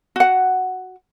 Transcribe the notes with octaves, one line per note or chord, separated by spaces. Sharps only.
F#4 F#5